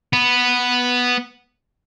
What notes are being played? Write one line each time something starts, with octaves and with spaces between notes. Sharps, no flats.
B3